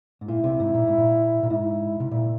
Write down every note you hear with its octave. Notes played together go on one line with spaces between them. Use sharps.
G#2
A#2 E4
C2 C3
G#2
A#2
G#2
A#2
A#2
G#2 E4
C3
A#2